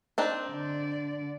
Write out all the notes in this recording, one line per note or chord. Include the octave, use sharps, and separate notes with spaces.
C4 D4 D#4
D3 D5